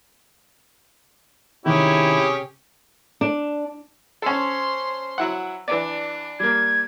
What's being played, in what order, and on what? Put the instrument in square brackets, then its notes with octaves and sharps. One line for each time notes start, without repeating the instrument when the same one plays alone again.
[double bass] C3 [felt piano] D#3 [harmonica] C#4 G4 G#4 [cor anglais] E4
[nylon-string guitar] D4
[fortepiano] C#4 A4 [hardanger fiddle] C5 C6
[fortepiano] F#3 E4 F#5
[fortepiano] E3 D5 [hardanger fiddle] D4
[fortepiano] G3 A#3 [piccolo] G#6